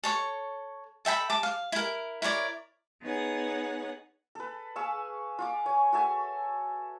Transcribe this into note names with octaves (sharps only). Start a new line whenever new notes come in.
A4 C#5 C#6
A4 E5 G5 B5
A5 D6
F5
E4 A#4
E4 A#4 C#5 D5
B3 D#4 G#4 C#5 F#5
A4 B4
G#4 F5 C#6 E6
F4 C#6 D6
C#5 G#5
F#4 A4 E5 G#5